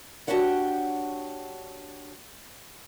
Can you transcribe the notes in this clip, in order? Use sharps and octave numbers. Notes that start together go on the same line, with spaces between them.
D4 F#4 G4 C#5 F#5 G5